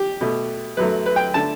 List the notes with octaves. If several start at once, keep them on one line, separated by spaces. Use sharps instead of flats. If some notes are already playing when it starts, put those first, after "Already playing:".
Already playing: G4
B2 A3
F#2 F#3 A3 B4
B4
G5
D3 A3 A5